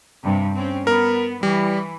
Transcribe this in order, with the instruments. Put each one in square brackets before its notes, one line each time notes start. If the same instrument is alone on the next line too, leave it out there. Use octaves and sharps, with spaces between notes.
[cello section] G2 C3
C4 C#4
[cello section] B3 [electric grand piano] A#4
[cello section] E3 [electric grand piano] G3